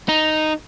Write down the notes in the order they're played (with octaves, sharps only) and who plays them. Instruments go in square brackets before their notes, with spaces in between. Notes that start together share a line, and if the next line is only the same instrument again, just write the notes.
[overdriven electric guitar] D#4